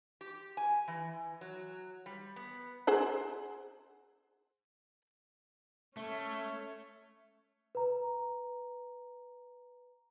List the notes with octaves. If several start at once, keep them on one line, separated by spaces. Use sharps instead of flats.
G4
G#5
E3
F#3
G3
B3
G#4 C5 F#5
A3 C#4 C#5
B4 A#5